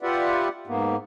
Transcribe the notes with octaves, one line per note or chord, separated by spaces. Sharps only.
F4 G4 B4 D5 E5 F#5
G#2 A#3 B3